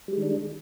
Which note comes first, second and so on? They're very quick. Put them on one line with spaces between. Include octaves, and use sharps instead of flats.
G3 G#3 D#3 D4